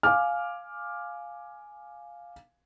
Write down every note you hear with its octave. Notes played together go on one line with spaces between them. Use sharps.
F5 G#5 D6 F6